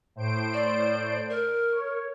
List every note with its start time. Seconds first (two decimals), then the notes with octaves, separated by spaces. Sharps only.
0.16 A2 C5 D7
0.54 D5
1.30 A#4
1.71 C#5